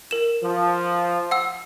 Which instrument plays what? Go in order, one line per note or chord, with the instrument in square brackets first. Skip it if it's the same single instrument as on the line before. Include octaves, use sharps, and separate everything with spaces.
[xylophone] A#4 E7
[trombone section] F3
[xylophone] F#5 E6